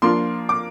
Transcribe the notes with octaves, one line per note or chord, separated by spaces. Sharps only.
F3 A#3 D4 F4 C6
D6